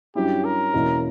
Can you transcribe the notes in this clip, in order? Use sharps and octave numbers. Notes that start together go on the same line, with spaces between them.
G2 F#3 C#4 E4 G4
A#4
E2 B2 A#3 C#4 E4